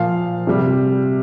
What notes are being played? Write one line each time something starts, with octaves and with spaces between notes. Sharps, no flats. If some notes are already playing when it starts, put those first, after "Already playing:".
Already playing: A#2 F3 F5
C3 G3